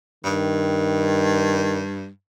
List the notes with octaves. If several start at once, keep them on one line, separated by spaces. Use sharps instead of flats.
G2 D#3